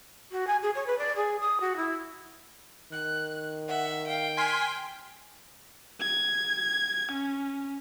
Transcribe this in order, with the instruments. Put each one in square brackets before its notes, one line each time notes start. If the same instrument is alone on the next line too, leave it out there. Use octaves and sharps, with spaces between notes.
[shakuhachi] F#4
G#5
G#4
C#5
B4
D5
G#4
D#6
F#4
E4
[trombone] D#3 [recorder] F#6
[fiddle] E5 [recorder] F#5
[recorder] F5 [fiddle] G5
[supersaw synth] G#5 C6 B6 [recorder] F6
[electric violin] G#6
C#4